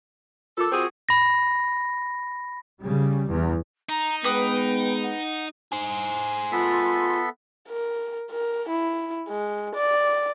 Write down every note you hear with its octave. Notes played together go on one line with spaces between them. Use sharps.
F4 A4 A#4 D6
C4 F#4 G#4
B5 A#6
C#3 G3
E2
D#4 A#5
G#3 B3 B4 G5 D#6
F#5
G#4 C5
B3 F4 A4 E5
A#4
A#4
E4
G#3
D5